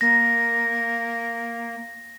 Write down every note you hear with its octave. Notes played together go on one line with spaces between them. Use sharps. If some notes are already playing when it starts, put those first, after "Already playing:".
A#3 A#6